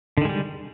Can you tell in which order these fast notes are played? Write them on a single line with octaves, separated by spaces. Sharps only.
D3 D#3 G#3 G3